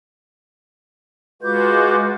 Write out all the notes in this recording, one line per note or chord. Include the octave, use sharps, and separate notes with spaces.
G#3 F4 F#4 B4 D6 G6